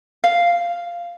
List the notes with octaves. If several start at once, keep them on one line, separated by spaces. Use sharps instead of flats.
F5